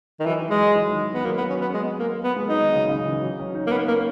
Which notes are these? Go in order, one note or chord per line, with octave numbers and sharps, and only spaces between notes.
D#3
E3 F#3
E3
G#3
F#3
E3
D#3
B3
F#3 A#3
B3
C#4
B3
G#3
A#3
B3
G#3
F#3 D#4
D#3
C#3
C#3
E3
F#3
C#4
D#4
A#3
B3 D#4
A#3 C#4